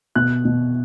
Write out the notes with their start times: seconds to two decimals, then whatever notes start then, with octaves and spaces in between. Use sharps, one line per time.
0.15 B2 F#6
0.45 B2